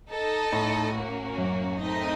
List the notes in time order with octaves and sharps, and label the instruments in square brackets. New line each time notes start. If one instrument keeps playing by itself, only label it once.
[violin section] D#4 A4 D#5
[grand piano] A2
[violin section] A#3 C#4 F#4
[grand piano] F#2
[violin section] A3 C4 D#4 A#4 D#5